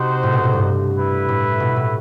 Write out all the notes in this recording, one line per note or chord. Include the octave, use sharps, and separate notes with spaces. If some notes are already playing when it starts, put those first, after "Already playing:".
Already playing: C3 D#4 F#4 C5
A2
B2
A2
G2
E4 B4 E5
A2
B2
A2